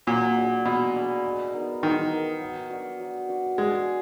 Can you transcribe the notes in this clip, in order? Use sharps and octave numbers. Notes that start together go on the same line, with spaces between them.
A#2 F#3
D4 G#4 D5
B2 F#3
D4 G#4 D5
G#3
B3 D#4 A#4
D#3 G#3
B3 D#4 A#4
F#3
D4 F#4 B4
F#3
D4 F#4 B4
G#3 D4